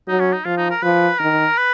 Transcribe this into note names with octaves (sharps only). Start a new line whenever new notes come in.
F#3 D#4
C#4
D#4
F3 F4
D#4
A#4
F3 B4
D#3 A#4
B4